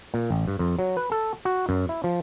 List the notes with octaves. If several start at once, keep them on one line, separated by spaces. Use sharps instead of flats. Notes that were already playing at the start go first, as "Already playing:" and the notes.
A#2
A1
G2
F2
F#3
B4
A4
F#4
F#2
E4
F3